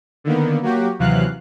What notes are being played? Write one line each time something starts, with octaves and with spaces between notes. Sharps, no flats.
D3 D#3 A#3 B3
F#3 A#3 F#4 G4
D#2 C3 E3 F#3 F5 F#6